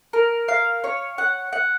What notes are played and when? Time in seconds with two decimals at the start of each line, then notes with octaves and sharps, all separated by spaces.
0.13 A#4
0.48 F5
0.84 C#5
1.18 F#5
1.53 F#5